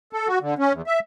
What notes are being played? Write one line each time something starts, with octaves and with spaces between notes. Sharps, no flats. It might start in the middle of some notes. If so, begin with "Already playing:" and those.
A4
F#4
D3
C#4
E2
E5